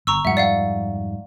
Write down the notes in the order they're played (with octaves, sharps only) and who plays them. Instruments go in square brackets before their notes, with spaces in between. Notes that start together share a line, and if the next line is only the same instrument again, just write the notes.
[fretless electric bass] G1 [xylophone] A#5 C#6 E6
[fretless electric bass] F2 G#2 G3 [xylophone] E5 F#5
[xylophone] D5 F5 F#5